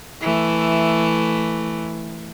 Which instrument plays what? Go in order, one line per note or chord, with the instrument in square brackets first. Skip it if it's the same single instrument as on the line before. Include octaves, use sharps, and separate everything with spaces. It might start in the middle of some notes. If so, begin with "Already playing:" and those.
[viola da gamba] E3 A3